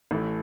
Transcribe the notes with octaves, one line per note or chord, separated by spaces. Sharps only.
A1 A2 E3 A3